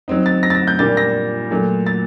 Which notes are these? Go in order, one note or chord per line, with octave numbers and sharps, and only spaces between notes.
F#3 C4 D#4
A6
A#6
A6
A#6
G6
A#2 G3 A#3 D4 A6
A#6
A#2 F#3 A3
A6